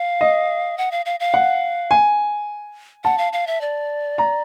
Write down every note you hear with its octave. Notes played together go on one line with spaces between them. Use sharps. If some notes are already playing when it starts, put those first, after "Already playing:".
Already playing: F5
D#5
F#5
F5
F5
F5
F#5
G#5
F#5 A5
F5
F5
E5
D5
A#5